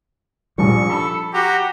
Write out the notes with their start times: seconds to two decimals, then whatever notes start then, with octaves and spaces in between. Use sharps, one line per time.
0.58 A#1 F3 G3 C#6
0.90 A4 B5
1.33 F#4 G4 A#5